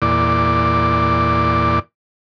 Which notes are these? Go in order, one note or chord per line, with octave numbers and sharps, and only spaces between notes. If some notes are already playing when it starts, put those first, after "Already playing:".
E2 A#2 D5